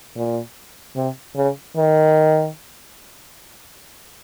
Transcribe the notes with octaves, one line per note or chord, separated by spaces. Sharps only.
A#2
C3
C#3
D#3